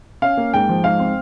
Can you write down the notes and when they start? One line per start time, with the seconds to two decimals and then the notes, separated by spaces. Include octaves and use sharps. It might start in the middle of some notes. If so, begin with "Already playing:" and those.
0.22 C#4 F5
0.37 A#3
0.54 G#2 G5
0.69 F3
0.84 G#2 F5
1.00 C4